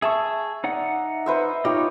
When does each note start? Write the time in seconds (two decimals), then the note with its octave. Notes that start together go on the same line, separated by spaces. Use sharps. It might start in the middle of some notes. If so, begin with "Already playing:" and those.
0.02 G#4 E5 A5 C#6
0.64 D#4 D5 F#5
1.26 B4 C5 E5
1.65 D#4 F4 G4 C#5 D#5